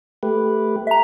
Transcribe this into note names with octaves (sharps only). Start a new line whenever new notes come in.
A3 G4 B4
E5 A#5